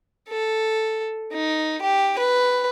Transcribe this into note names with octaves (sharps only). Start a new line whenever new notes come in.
A4
D#4
G4
B4